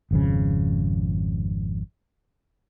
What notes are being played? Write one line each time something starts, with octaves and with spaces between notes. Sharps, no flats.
G#1 F2 C#3